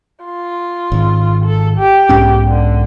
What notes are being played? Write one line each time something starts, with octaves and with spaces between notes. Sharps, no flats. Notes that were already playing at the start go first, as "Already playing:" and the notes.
F4
G#1
A4
G4
B1 G#2 C#4
D3